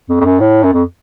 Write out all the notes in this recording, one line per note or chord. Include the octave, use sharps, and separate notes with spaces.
F2
F2
F#2
A2
F#2
F2